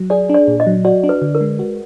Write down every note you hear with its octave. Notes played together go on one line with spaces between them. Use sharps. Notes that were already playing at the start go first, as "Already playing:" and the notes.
Already playing: F#3
G#4 D5
D4
D5
A#2
D#5
F#3
F#4 D5
D4
B4
D3
A#4
G#3
F#4